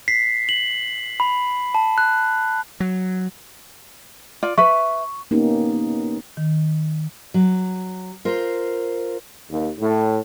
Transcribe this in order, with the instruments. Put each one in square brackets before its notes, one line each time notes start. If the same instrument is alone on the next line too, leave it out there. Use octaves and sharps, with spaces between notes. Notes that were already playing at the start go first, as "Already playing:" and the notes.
[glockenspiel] B6 C7
F#7
B5
A5
F#6
[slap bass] F#3
[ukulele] F4 D5
[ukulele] B4 E5 [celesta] C#6
[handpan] A#3 B3 C#4 D#4 G4
[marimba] D#3
[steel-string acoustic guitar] F#3
F4 A#4 C5
[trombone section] D#2
A2